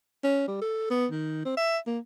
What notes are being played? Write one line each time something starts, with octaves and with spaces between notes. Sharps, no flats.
C#4
G3
A4
B3
D#3
C4
E5
A#3